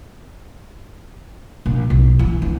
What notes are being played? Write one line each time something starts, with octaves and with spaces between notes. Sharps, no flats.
A#1
B1
E3
G1